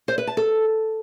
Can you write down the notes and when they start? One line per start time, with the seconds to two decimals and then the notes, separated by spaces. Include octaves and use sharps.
0.08 C5
0.18 B4
0.27 A5
0.37 A4